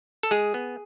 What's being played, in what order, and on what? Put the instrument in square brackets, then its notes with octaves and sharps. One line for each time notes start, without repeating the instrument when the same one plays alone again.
[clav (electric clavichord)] A4
G#3 G#4
B3